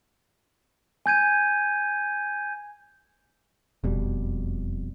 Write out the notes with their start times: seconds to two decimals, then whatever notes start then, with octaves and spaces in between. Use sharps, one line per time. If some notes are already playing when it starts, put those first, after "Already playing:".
1.06 G#5 G6 G#6 D#7
3.84 E1 F2 B2 G3